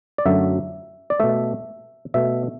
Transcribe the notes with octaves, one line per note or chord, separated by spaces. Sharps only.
D5
F#2 D3 F#3 A3 E5
D5
B2 A3 E5
B2 A3 E5